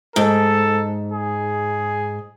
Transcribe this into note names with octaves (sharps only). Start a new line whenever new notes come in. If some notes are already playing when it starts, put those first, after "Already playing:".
G#2 A4
G#4